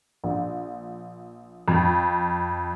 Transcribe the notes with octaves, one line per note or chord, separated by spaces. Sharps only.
A#1
F2